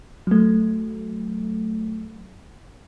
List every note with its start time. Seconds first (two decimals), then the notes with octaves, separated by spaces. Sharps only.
0.27 F#3 A3